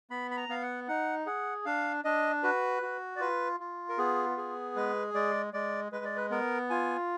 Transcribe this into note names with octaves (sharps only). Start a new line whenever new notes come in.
B3 B5
B5
A#5
B3 F5
F#5
D#4 F#5
G#4 F#5
D4 F5
D4 D#5
F#4 B4
F#4
D5
F4 B4
F4
A#4
B3 G#4
G#4
G#3 B4
G#3 D5
G#3 D5
G#3 B4
D5
B4
B3 A#4
F4 G#5